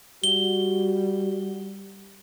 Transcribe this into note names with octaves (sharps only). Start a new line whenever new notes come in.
G3 F#4 G7